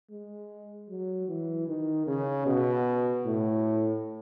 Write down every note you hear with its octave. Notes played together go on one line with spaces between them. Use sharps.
G#3
F#3
E3
D#3
C#3
B2
A2